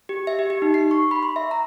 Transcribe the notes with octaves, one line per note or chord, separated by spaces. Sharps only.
G4
E5
G4
G4
D#4
C7
C#6
B5
C6
E5
A#5